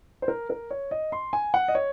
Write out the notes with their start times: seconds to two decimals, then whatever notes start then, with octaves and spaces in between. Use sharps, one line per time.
0.22 C5
0.28 A#4
0.50 A#4
0.71 C#5
0.91 D#5
1.12 C6
1.33 G#5
1.54 F#5
1.68 D#5
1.75 C#5